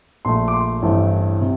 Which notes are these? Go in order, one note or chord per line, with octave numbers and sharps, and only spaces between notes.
A#1 A#2 A3 C6
D6
C6
A1 G2 E3 A3 C4
C3